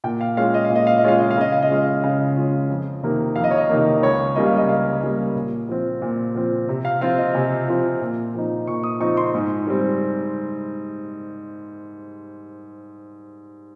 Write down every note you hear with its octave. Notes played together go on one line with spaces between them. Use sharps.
A#2 G5
F5
G#3 C#4 F4 F5
D#5
F5
A#2
D#5
F5
D#5
G#3 C#4 F4 F5
D#5
F5
C#3 D#5
F5
D#5
G#3 C#4 F4 F5
D#5
C#3 F5
G#3 C#4 F4
F2
C3 D#3 A#3
F2 F5
D#5
C#5
D#5
C3 D#3 A#3
C#2 C#5
C#3 G3 A#3 D#5
F5
D#5
C#2 F5
C#3 G3 A#3
A#2
F3 C4
A#2
F3 C4
C3
F5
F3 C4 F4 F5
D#5
C3 G#5
F3 C4 F4
A#2
F3 C4 D#4
A#2 C#6
D#6
F3 C4 D#4 C#6
C6
G#2
G3 C4